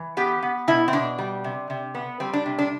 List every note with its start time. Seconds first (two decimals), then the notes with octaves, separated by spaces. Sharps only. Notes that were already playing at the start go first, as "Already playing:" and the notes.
Already playing: E3
0.17 B3 G4
0.43 B3
0.68 B2 E4
0.88 C4
0.93 B2 D4
1.18 G3
1.44 C3
1.70 C3
1.95 B3
2.20 G3 C4
2.33 D4
2.46 C3
2.59 D4